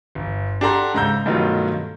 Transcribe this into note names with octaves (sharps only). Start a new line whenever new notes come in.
G1
D4 G4 A4 F#5 A#5 C6
G#2 C#3 A#5 E6 G6
G2 B2 D#3 F#3 A3 F4